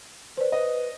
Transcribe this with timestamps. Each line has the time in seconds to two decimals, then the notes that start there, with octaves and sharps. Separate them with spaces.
0.37 B4 C5 D5
0.52 B4 D#5